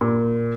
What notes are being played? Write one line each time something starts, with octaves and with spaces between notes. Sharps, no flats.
A#2